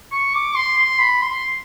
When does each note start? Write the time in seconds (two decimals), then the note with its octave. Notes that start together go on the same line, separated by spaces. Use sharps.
0.12 C#6
0.34 D6
0.56 C6
0.78 C6
0.99 B5
1.22 C6